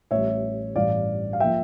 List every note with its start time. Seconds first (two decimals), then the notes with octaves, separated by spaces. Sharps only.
0.11 A1 A2 G3 C#5 E5
0.76 A1 G2 E3 D5 F5
1.33 F5
1.40 F3 A#3 E5 G5